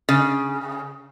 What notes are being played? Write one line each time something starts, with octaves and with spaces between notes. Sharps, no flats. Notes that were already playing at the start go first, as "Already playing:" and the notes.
C#3